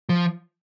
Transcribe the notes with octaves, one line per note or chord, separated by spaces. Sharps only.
F3